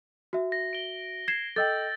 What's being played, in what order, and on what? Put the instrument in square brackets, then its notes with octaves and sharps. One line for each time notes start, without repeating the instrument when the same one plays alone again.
[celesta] F#4 E5
[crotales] A#6
D7 G7
[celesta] G#6 C7 E7
[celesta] A4 D#5 G5 [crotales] E6 G6 A6